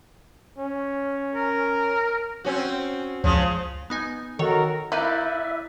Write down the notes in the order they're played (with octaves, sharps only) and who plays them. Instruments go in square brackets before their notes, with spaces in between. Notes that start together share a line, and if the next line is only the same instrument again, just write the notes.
[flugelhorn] C#4
[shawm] A#4
[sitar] C4 C#4 F#4
[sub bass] C#2 [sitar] C#3 F3
[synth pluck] B3 D#4 G#5
[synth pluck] D#3 C#5 [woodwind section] F#4 A4 A#4
[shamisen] A#3 [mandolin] D#4 B4 D5 [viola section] E4 [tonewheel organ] E5